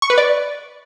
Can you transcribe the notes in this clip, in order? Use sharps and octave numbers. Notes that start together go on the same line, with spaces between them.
C#6
B4
D5